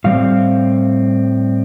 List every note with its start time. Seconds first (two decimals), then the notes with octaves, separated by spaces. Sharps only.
0.04 A2 G3 C4 F5